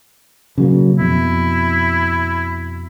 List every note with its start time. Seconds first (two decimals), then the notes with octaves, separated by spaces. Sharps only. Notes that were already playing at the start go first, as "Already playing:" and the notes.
0.58 C#3 F#3 A#3
0.99 F2 B2 E4